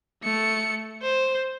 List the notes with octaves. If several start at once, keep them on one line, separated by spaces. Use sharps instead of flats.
A3 C#7
C5